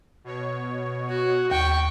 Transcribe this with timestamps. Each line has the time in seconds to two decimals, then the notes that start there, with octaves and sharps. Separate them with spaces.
0.24 B2 C#5
1.08 F#4
1.51 D#2 G5 C#6